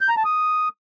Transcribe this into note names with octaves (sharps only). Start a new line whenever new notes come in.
G6
A#5
A5
D#6